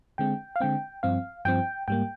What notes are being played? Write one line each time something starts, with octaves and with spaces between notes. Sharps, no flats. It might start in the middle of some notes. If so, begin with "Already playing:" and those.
D3 G#3 C4 G5
F5
D3 G#3 C4 G5
G2 F3 C4 F5
G2 F3 C4 G5
G#2 G3 A#3 G5